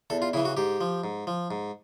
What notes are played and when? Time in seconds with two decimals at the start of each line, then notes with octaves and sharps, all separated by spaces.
0.10 E2 A4
0.22 F4
0.33 C#3 E3 E4
0.45 F#4
0.57 G#2 G4
0.81 F3
1.04 G#2
1.27 F3
1.51 G#2